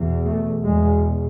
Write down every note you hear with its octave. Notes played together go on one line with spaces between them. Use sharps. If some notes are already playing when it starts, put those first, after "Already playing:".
Already playing: E2 B2
A3
E2 B2 G#3